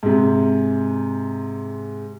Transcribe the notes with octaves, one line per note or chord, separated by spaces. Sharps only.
G#2 C3